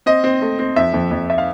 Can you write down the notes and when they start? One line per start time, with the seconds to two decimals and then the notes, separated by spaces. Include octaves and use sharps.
0.06 C4 D#5
0.24 C4
0.42 A3
0.59 C4
0.76 F2 E5
0.94 F2
1.11 F2
1.30 E5
1.38 F5